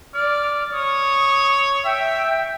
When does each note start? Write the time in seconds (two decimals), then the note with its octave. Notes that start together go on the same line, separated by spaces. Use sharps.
0.14 D5 F6
0.72 C#5 D#6
1.85 E5 G5